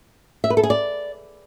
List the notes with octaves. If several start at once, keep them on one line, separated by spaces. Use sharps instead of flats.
E5
B4
A4
G#4
D5